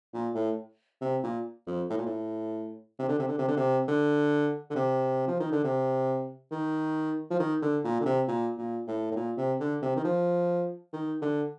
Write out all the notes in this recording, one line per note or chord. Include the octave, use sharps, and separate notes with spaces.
A#2
A2
C3
A#2
F2
A2
A#2
A2
C3
D3
C3
D3
C3
D3
C3
D3
D3
C3
F3
D#3
D3
C3
D#3
F3
D#3
D3
A#2
D3
C3
A#2
A#2
A2
A2
A#2
C3
D3
C3
D#3
F3
D#3
D3